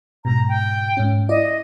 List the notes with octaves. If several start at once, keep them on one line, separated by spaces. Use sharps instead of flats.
G#2 B2 A#5
G5
G#2 C#4
E4 D5 D#5